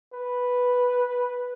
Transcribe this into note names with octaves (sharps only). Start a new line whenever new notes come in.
B4